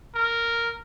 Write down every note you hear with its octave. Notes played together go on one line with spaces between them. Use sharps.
A#4